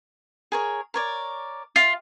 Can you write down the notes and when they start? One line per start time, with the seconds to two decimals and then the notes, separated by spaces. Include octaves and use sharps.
0.52 G#4 A#4 C#5
0.94 A#4 C#5 D5
1.76 F4